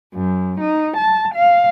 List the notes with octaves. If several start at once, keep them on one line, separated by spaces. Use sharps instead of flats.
F#2
D#4
A5
F5